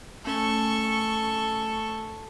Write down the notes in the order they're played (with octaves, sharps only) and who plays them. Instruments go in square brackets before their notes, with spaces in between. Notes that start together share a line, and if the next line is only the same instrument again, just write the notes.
[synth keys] A3 C#4 G#5 [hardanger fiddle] A4 C#6